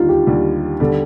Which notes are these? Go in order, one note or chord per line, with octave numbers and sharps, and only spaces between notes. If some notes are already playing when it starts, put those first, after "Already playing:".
Already playing: D#2 D3 G3 D#4 F4
G4
D#2 D3 G3
D3 G3 A4